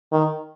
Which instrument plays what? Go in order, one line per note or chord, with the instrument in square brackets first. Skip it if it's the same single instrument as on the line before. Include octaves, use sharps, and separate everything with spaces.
[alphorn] D#3